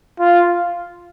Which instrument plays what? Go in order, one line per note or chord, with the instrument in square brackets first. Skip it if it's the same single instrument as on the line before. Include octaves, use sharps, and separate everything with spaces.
[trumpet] F4